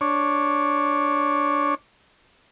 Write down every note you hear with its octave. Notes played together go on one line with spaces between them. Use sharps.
D4 C#5